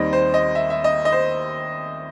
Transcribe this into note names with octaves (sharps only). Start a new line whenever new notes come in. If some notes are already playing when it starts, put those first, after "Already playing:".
Already playing: D#2 D#3 G3 C4 D#5
C5
D#5
E5
E5
D#5
D#5
C5